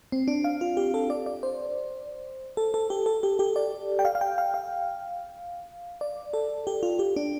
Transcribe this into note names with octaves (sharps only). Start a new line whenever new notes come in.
C4
D4
F5
F4
G4
A4
D5
D5
C5
A4
A4
G4
A4
G4
G4
D5
G5
F5
F5
G5
F5
F5
D5
A4
G4
F4
G4
D4